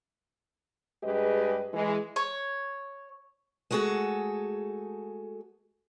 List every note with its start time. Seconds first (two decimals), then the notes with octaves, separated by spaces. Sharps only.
1.04 G2 G#3 G4 G#4 B4 D#5
1.74 E3 G#3
2.16 C#5
3.71 G#3 A3 F#4 G#4 A4